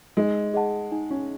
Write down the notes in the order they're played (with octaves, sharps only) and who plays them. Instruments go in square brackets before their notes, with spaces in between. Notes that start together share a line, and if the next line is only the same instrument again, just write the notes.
[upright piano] G#3 [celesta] D#4
[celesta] G#4 D#5 F#5 A5
D#4
[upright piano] C#4